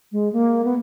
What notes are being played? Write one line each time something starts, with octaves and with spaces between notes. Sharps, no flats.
G#3
A#3
B3